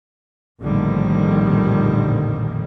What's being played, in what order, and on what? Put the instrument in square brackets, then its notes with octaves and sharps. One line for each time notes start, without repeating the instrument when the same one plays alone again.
[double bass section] A#1 F2 A2 D3 D#3 G3